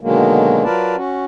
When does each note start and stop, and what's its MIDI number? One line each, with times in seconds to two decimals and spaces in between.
0.01 0.64 47
0.01 0.64 50
0.01 0.64 51
0.01 0.64 54
0.01 0.64 56
0.01 0.64 58
0.64 0.96 54
0.64 0.96 65
0.64 0.96 70
0.64 0.96 71
0.64 0.96 74
0.64 0.96 81
0.96 1.25 61
0.96 1.25 66